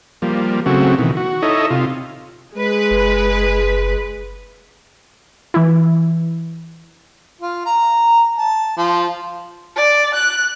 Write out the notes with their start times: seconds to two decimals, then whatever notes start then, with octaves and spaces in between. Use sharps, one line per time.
0.22 F3 G3 A#3
0.66 C#3 F#3 A3 C4 F#4
0.99 B2 D#3 E3
1.17 F#4
1.42 D#4 E4 A4 C#5 D#5
1.71 C3 F4
2.54 G#3 B4
2.91 F#1
5.54 E3 E4
7.41 F4
7.66 A#5
8.38 A5
8.77 F3
9.76 D5
10.14 F#6